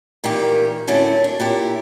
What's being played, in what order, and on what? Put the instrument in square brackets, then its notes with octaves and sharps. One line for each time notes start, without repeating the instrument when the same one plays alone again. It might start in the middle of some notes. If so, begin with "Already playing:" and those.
[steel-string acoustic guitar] A#2 D#3 E3 A#3 G4
A2 D3 F#3 A3 C#4 F#4
D4
A#2 E4 G4